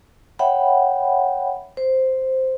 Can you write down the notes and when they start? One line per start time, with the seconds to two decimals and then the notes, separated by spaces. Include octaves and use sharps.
0.39 C#5 E5 F#5 G5 B5
1.77 C5